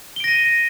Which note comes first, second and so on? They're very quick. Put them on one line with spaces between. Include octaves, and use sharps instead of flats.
G7 D7 A#6 D#7